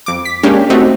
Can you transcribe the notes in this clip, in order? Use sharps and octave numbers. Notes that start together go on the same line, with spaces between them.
F2 D6
B6
G#3 A#3 C#4 D4 G4
A3 C4 D#4 F#4